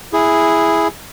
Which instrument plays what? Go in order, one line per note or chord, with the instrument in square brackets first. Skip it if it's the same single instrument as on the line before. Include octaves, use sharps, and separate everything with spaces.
[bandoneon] E4 G#4